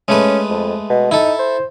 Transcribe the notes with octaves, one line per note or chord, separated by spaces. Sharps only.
G#3 A3 C#4 B4
F2
B2
D#4 E4 A4
C5